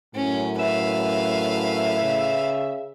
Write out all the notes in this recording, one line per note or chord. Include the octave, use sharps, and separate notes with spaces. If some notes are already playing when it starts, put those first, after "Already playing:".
F#2 A2 C#4
B4 E5 F5
C#3